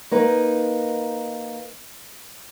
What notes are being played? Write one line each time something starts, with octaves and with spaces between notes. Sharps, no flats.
A#3 D#4 B4